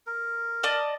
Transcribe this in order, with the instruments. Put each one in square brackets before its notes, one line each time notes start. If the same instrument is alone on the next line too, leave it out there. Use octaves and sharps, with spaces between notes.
[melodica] A#4
[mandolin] D5 D#5 A5